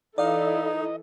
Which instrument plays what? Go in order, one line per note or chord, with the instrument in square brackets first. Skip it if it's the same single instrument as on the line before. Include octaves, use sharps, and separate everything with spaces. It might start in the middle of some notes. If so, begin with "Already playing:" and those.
[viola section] E3 E4 A4 [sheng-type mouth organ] D#4 [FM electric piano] D5 F5 [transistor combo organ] D#5